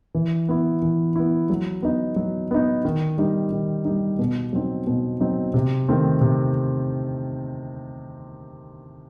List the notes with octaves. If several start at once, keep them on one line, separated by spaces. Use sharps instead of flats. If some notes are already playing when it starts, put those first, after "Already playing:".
E3
B3 E4
E3
B3 E4
F#3
B3 D#4
F#3
B3 D#4
D#3
G3 D#4
D#3
G3 D#4
B2
F#3 C4 D#4
B2
F#3 C4 D#4
C3
D#3 A3 C4
C3